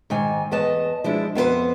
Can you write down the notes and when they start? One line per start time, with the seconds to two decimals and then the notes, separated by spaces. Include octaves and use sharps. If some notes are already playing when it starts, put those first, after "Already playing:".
0.10 G#2 D#3 G#5
0.51 E2 B4 D#5 A5
1.04 F3 G#3 D4 E4
1.35 F2 B3 C#4 B4 C5